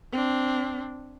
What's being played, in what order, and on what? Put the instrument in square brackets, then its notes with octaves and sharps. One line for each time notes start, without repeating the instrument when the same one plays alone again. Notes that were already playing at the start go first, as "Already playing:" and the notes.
[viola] C4 D4